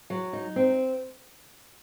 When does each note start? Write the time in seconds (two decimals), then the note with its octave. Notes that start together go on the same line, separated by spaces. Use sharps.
0.10 F#3
0.33 D#4
0.56 C4